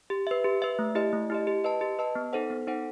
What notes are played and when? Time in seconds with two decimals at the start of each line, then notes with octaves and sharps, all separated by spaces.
0.10 G4
0.27 B4 E5
0.44 G4
0.62 B4 E5
0.79 A3
0.95 E4 G4 D#5
1.13 A3
1.30 E4 G4 D#5
1.47 G4
1.64 B4 D#5 A5
1.81 G4
1.99 B4 D#5 A5
2.15 B3
2.33 D#4 A4 C5 F#5
2.50 B3
2.67 D#4 A4 C5 F#5